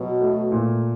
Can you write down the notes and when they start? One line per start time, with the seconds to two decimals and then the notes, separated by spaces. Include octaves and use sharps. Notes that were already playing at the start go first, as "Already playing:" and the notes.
Already playing: B2 F#3
0.21 A3
0.52 A#2